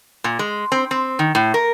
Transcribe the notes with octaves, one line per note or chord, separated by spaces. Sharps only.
A#2
G#3
C4
C4
D#3
A2
A#4